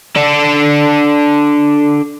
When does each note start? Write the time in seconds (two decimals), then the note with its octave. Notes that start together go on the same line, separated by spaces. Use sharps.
0.16 D4 A4